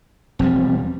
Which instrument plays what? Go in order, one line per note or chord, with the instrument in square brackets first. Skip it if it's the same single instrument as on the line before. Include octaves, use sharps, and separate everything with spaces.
[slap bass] E1 F3 G3 [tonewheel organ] C4